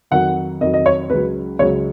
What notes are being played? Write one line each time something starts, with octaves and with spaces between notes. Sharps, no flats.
F2 D#3 F#3 F#5
F2 D#3 F#3 D#5
D#5
C#5
C#2 C#3 F#3 B4
C#2 C#3 F#3 C#5